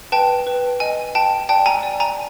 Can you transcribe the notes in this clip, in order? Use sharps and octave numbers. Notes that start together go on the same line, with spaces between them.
B4 G5 A5
B4
D#5 G#5
G5 A5
D5 G5 A5
G#5 A#5
D5
G#5 A#5